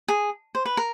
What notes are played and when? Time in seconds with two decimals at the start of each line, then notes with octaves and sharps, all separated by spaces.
0.08 G#4
0.55 C5
0.65 B4
0.77 A#4